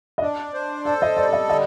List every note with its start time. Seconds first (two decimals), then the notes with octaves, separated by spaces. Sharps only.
0.18 D#5
0.22 D4 D5
0.54 C5
0.85 A4 D5
1.02 D#5
1.17 G3 D5
1.33 D#5
1.49 D3 D#5